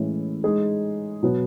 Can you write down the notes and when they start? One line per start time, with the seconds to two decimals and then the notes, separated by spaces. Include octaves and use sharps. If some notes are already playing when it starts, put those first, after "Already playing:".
Already playing: A2 E3 G#3 C#4 E4
0.44 G#3 D#4 G#4
1.23 B2 F#3 B3